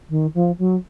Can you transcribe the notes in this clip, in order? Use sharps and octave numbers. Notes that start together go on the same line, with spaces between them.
D#3
F3
F#3